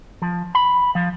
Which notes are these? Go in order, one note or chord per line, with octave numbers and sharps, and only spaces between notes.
F3
B5
F3